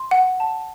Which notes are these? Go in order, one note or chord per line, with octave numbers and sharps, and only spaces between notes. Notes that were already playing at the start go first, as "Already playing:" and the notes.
Already playing: C6
F#5
A5